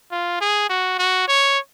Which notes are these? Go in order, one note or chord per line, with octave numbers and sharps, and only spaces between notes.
F4
G#4
F#4
F#4
C#5